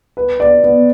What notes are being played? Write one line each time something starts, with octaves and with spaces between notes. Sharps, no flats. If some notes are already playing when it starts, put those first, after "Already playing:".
B4
D5
B3